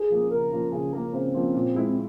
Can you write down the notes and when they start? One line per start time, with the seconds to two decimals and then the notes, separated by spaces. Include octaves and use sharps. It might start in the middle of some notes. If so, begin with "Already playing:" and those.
Already playing: G#4
0.10 F3 A#3 C#4
0.31 C#3 A#4
0.51 F3 A#3 C#4
0.72 C#3 G#4
0.93 F3 A#3 C#4 A#4
1.13 C#3 C4
1.34 F3 A#3 C#4
1.55 A#2
1.75 G#3 E4
1.87 C4